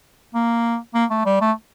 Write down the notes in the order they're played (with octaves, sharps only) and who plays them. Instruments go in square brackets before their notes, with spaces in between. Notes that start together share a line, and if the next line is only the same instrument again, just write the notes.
[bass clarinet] A#3
A#3
A3
G3
A3